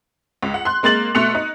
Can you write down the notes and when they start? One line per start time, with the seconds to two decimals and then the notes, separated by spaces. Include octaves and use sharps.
0.43 C#2
0.54 F#5
0.65 C6 F#6
0.83 G#3 A#3 C6 A6 F#7
1.15 B2 A3 C6 F#6 C#7 F7
1.35 D#4